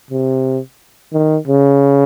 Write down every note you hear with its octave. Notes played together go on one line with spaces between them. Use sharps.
C3
D#3
C#3